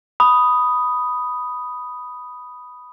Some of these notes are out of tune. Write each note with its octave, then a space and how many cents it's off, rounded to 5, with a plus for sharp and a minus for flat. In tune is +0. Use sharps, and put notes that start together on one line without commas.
B5 +0 D#6 +0